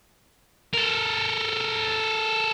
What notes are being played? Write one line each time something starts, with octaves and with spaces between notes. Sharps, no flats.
A4 A#4